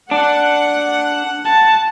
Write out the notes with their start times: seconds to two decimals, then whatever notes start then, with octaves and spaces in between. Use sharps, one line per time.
0.11 D4 F#5
1.46 A5